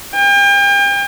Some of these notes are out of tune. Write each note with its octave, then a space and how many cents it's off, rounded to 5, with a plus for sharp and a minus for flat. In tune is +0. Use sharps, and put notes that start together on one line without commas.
G5 +40